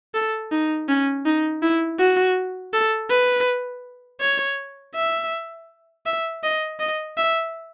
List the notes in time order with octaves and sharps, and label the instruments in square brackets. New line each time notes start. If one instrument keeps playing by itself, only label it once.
[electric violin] A4
D#4
C#4
D#4
E4
F#4
A4
B4
C#5
E5
E5
D#5
D#5
E5